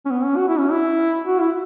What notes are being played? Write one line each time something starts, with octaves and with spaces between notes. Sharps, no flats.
C#4
B3
C#4
F#4
E4
C#4
E4
F#4
E4